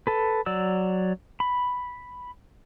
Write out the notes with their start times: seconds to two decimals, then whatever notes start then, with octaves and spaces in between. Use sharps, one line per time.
0.07 A4 B4
0.46 F#3 D5 E6
1.40 B5